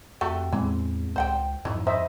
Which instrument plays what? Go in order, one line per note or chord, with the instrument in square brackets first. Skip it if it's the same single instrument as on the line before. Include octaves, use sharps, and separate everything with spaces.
[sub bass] F2 [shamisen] A3 F#4 G4
[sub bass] E2 [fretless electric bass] A2 G#3 C4 [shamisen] E3
[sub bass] C#2 [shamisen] C5 F#5 G5
[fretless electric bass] F2 [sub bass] G#2 [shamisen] D#3 E3
[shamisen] E4 [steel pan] C5 D#5 E5